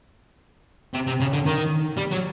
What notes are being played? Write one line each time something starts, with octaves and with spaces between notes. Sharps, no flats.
C3
C3
C#3
D3
D#3
G3
F#3